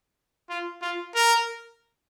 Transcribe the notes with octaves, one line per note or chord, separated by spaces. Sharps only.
F4
F4
A#4